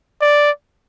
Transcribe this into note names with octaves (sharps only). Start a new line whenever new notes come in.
D5